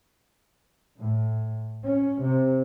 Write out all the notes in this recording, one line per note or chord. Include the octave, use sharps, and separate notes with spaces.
A2
C#4
C3